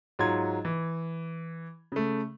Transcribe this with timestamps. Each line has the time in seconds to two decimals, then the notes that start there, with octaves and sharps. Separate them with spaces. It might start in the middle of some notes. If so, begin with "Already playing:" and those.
0.19 G#2 F#3 F4 C6 G#6
0.65 E3
1.92 C#3 A3